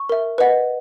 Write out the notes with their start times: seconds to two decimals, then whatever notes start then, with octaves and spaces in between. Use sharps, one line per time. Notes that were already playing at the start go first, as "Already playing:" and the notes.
Already playing: C#6
0.09 A#4 E5
0.38 B4 D#5 F#5